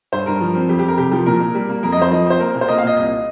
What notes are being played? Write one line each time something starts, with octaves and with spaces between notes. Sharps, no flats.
G2 C5
G2 A#4
F3
C4
F2 G4
G4
F2 A#4
C3 G4
F3 G4
A#2 A#4
A#2
G3
A#3
F2 A#4
D#5
F2 C5
F3 D#5
C4 C5
A#3 A#4
A#2
C5
A#3 D#5
F5
A#2 D#5
C2 D#5